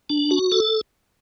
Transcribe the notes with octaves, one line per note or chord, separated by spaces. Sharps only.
D4
F#4
A4